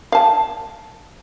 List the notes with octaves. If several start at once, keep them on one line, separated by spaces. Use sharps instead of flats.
F5 A5